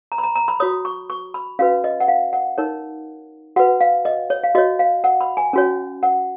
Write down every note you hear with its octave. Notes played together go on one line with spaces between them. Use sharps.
A#5
B5
A#5
A#5
B5
F#4 C#5 D#6
C#6
C#6
B5
C#4 F#4 B4 F5
D#5
F#5
F5
F#5
D#4 A#4 C#5
F#4 B4 F#5
F5
D#5
C#5
F5
F#4 C#5 D#5
F5
F#5
B5
G#5
C#4 F#4 C#5
F#5